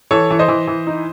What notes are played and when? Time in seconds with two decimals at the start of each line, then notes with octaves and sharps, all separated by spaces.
0.11 E3 A4 C#5
0.30 E3
0.39 C5 D#5
0.48 E3
0.68 E3
0.87 D#4